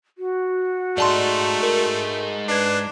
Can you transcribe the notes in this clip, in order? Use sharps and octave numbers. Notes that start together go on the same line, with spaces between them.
F#4
G#3 A3 D#4 D5 A5 C6
A#4
D4 B4 G#6 C7